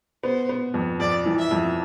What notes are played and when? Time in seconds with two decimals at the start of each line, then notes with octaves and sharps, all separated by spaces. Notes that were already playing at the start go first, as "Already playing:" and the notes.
0.23 B3 C5
0.49 B3
0.74 F2
1.00 F2 D5
1.26 E3
1.38 E5
1.51 F2